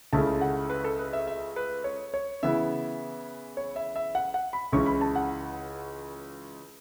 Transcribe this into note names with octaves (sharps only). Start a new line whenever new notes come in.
C#2 C#3 A3 C#4 E4 A5
F#5
B4
A4
B4
E5
E5
B4
C#5
C#5
C#3 E3 B3 E4 E5
C#5
E5
E5
F#5
F#5
B5
C#2 C#3 E3 C#4 E4 C#6
B5
A5
F#5